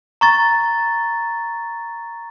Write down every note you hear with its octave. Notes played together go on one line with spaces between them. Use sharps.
A#5 C#6 A6